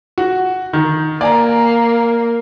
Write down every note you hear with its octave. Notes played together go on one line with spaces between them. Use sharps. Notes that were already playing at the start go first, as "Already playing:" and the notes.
F#4
D#3
A#3 D5 G#5 A#5